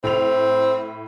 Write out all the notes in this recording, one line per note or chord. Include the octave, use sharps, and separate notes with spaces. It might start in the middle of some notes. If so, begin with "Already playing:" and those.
A2 C4 B5 F7